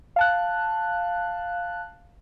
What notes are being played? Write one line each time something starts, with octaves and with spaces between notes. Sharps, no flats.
F5 A5 F#6